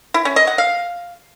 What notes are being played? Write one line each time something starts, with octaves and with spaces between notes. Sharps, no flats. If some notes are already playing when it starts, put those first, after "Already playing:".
E4
C#4
D#5
F#5
F5